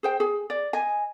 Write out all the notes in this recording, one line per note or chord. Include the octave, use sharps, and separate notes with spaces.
G#4 C5 G5
G#4
D5
D#5 G#5